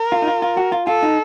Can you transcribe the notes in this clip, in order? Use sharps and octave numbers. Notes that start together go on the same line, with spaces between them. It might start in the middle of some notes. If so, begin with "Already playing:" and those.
Already playing: A#4
F4
D#4
F4
F4
F#4
F4
F4 A4
D#4